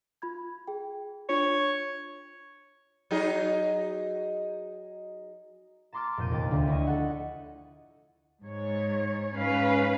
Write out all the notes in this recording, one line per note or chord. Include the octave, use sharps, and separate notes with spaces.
F4 B5 G#6
G#4 G5
D4 F4 C#5
F#3 D#4 G#4
A5 A#5 C6 D6 F6 A6
F1 A#2 G6 D#7
D#2 G5 D6 A6
D2 D3 F4
E4 C#5 D#5
A4 F#5
G#2 C#5
G#2 C#4 B4 F5